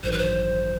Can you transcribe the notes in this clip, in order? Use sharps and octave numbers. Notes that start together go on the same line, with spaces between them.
A1 G2 D#3 F#3 C5
B4
C5